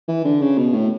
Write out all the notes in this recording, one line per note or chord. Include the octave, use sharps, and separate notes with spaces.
E3
D3
C#3
B2
A2